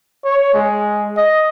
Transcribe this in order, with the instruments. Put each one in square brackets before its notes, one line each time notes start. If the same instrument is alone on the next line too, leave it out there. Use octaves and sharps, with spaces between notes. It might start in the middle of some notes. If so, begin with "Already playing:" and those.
[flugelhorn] C#5
G#3
D#5